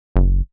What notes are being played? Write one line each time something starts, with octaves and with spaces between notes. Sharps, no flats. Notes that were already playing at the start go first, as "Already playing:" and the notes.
F#1